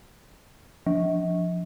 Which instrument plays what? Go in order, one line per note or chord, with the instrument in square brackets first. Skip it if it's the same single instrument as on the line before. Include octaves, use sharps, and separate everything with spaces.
[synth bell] F3